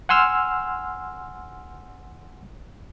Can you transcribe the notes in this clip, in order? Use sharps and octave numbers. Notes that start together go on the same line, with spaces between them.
F#5 G#5 C6 E6 F6